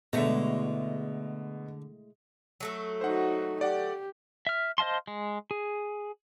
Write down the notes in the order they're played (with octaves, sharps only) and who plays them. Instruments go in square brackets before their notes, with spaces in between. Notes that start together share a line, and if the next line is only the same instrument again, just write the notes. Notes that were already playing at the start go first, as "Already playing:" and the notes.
[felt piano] B2 [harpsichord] D3 A#5 [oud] G#3 A3 E4
[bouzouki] F#3 A3 A4
[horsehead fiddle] D#4 F#4 [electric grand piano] C5 F#5
[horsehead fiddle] G4 [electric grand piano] D5 F#5
[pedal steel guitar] E5 F6
C5 D#5 F5 A5 C6
G#3
G#4